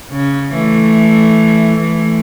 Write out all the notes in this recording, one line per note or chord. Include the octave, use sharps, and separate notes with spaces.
C#3
E3 A3
E3 A3